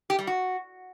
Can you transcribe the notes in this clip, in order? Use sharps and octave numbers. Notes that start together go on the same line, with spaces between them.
G4
G3
F#4